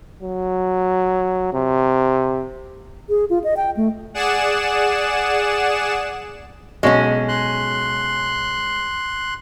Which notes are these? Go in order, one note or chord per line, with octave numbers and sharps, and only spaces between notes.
F#3
C3
G#4
F4
D#5
G5
A3
G#4 D5 F#5 E7
B1 G#3 C#4 F#4 C#5
C6 F#6